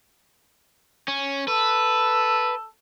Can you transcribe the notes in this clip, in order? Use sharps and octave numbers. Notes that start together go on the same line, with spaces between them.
C#4
A4 B4